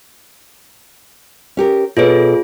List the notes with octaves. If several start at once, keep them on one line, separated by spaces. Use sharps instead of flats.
C#4 G4 A#4
B2 F4 G#4 A4 C#5